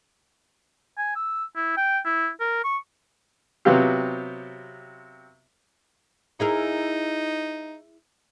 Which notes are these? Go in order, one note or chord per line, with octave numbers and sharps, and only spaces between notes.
G#5
E6
E4
G5
E4
A#4
C#6
C3 F#3 B3 F4 G4
D#4 E4 G#4 A#4